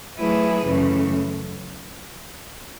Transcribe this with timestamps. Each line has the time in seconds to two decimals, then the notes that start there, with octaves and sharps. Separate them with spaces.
0.19 F#3 A3 E4 G#4 B4
0.65 F#2 C#3 E3 A3